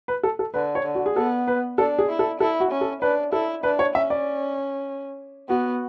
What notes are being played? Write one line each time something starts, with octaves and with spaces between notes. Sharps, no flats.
B4
A4
A4
D3 B4
C#5
D3
F#4
G#4
B3 A4
B4
D4 A4
G#4
E4
A4
E4 A4
F#4
C#4
A4
D4 B4
E4 A4
D4 B4
C#5
C#4 E5
D5
B3 F#4